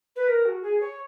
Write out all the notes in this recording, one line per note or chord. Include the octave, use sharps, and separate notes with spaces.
B4
A#4
F#4
G#4
C#5